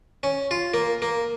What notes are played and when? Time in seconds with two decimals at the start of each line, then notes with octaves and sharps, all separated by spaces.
0.23 C#4
0.51 F4
0.74 A#3
1.02 A#3